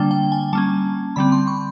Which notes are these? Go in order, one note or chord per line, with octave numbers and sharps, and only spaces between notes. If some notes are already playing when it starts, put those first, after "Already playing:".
Already playing: D3 G3 A#3 D4 G5
G5
G#5
G3 A#3 C#4 A5
D3 G3 C4 B5
C6
C#6